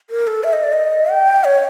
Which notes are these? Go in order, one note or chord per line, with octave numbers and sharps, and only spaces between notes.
A#4
A4
E5
D#5
D5
D#5
G5
C#5